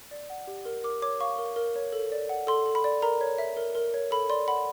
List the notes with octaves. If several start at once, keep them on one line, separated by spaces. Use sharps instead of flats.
D5
F#5
G4
A#4
A#4 D6
C#5 D6
F5 C#6
A#4
A#4
C#5
A4
D5
F#5
A4 C6
A4
B5
D5
A#4 A#5
C#5
E5
A#4
A#4
C#5
A4 B5
D5 C6
F#5 B5